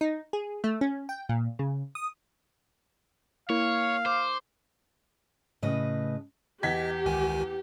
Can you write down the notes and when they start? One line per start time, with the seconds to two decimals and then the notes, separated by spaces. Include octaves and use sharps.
0.01 D#4
0.33 G#4
0.64 A3
0.81 C#4
1.09 G5
1.29 A#2
1.59 C#3
1.95 D#6
3.50 A#3 E4 A#4 C#5 F5
4.06 C5 D6
5.63 A2 C#3 B4 D#5
6.63 E2 G4 D#5 G#6 B6
7.06 C#2 D#3 G#5